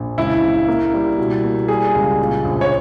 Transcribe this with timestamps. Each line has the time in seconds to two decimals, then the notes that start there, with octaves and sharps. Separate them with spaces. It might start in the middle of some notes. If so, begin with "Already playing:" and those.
Already playing: A#1
0.17 C#2 E4
0.42 C#3
0.68 A#3
0.94 G3
1.18 B2
1.44 A#3
1.68 G3 G#4
1.95 C#2
2.19 A#2
2.45 A#1
2.61 C#5